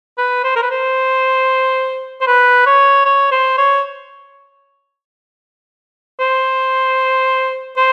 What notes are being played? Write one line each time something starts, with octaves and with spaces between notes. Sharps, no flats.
B4
C5
A#4
B4
C5
C5
B4
C#5
C#5
C5
C#5
C5
C5